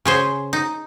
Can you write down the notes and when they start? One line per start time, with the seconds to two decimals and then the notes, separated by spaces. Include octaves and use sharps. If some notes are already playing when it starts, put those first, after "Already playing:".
0.05 C#3 G#4 C5
0.53 D#4